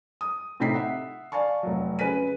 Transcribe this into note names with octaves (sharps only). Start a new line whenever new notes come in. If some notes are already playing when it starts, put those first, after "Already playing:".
D#6
A2 C3 D#4 G5 B6 C7
E5 F#5
D5 F5 G#5 A5 C#6
F1 F#3
C#3 B4 G#5 B6 D#7